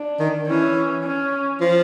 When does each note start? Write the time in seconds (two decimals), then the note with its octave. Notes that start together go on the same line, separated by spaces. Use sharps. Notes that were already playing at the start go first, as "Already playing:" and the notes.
Already playing: D4
0.20 D#3
0.48 E3 C#4
1.04 C#4
1.60 F3